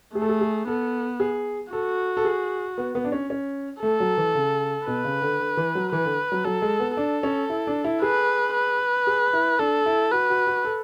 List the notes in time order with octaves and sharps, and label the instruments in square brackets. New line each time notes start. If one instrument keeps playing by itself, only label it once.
[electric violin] A3 [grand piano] G#4
[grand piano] A4
G#4
G#4
[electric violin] B3 [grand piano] A4
[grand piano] G#4
[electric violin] F#4 [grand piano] A4
[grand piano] A4
G#4
B3
B3
D4
C#4
C#4
[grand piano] A3 [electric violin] A4
[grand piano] F#3
E3
C#3
[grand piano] B2 [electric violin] B4
[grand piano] C#3
D3
D3
E3
F#3
[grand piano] E3 [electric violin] B4
[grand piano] D3
F#3
[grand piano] F#3 [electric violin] A4
[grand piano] G#3
B3
[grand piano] D4 [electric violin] A4
[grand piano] C#4
E4
D4
E4
[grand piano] G#4 [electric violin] B4
[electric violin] B4
[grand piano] G#4
E4
[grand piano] D4 [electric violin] A4
[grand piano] E4
[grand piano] F#4 [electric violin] B4
[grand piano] F#4
F#4
A4